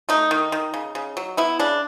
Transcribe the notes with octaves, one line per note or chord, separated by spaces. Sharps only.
A3 D#4
D#3
D#3
C#3
C#3
F#3
B3 E4
C#3 D4